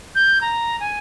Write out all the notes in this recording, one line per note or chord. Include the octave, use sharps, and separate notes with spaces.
G6
A#5
G#5